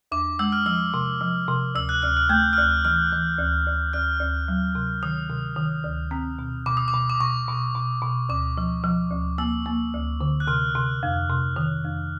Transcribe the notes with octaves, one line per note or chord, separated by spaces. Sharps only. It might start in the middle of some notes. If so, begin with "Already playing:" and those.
E2 D6
G#3 E6
F6
F3 E6
C3
F3
C3
D2 E6
F#6
D2 F6
F6
A3 G6
F6
D2 F#6
E3 F6
E3
D2
D2
D2 F6
D2
F#3
C3
D#3 D#6
C3
D#3
D2
C4
B2
B2 D6
D#6
D6
B2
D6
B2 C#6
B2
B2
B2
D2 D6
F3
F3
D2
A#3 E6
A#3
D2
D3
F#6
C3 F6
C3
F2
C3
D#3
F2